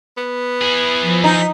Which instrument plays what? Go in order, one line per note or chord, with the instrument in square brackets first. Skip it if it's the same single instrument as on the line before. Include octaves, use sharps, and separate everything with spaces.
[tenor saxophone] B3
[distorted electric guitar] E4 G#4
[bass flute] F3
[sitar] D#4